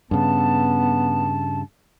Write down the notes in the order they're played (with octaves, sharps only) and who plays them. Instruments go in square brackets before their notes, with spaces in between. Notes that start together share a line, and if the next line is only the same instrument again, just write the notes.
[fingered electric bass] G2 C#3 [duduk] B3 [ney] A5